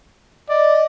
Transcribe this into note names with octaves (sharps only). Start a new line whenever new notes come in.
D5 D#5